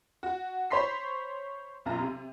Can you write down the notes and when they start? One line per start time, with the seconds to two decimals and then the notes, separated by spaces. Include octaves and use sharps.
0.23 F#4
0.71 C5 C#5 B5 C6 B6 C7
1.85 B1 F#2 F4 A#5
2.00 C3